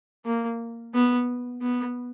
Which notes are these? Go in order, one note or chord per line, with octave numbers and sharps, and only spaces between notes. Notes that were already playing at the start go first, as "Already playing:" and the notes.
A#3
B3
B3